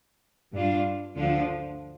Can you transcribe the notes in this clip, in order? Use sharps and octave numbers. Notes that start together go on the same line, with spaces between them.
G2 G3 D4 F4
D2 D3 F3 D4 F4